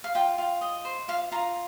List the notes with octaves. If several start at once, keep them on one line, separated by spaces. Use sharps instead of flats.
F5
F4 G5
F4
D#5
C5
F4 F5
F4 A#5